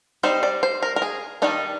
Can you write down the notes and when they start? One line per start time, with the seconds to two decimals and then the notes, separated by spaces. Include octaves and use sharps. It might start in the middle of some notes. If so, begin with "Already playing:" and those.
0.23 G3 C4 D#4 C5
0.43 D5
0.63 C5
0.83 A#4
0.96 A#4
1.02 G#4
1.42 D#3 G3 D4 D#4